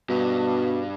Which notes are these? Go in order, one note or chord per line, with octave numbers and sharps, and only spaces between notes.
G2 B2